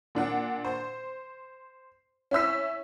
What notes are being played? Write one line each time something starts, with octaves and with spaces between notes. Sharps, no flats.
A#2 D4 F#5
C5
C#4 E4 E6 B6